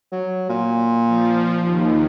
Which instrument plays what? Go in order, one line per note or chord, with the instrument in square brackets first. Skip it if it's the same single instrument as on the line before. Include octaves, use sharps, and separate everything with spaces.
[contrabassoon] F#3
A#2
[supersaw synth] F3
D#2